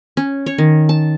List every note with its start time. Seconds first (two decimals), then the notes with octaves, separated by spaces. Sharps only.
0.17 C#4
0.46 C#5
0.58 D#3
0.89 A5